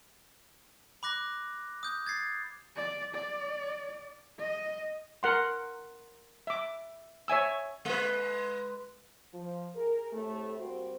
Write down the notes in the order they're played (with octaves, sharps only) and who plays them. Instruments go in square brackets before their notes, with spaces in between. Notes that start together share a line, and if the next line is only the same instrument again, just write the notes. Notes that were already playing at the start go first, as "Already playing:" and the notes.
[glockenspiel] B5 D6 F#6 A#6
D#6 G6
G#6 A6 C7
[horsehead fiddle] D5
D5
D#5
[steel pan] A#4 F#5 C6
E5 D6
C#5 E5 G#5 E6
[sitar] G#3 B4
[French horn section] F3
G#4 A#4
A2 C3 A3
G3 A#3 C4 F#4